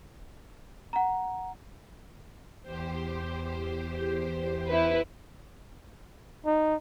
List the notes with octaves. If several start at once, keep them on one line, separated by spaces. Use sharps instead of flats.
F#5 A#5
E2 G4 C5
E4 B4
D#4